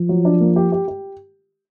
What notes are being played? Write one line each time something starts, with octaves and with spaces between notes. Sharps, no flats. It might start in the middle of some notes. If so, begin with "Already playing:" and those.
Already playing: F3
F#3
D4
A#3
G4
G4
G4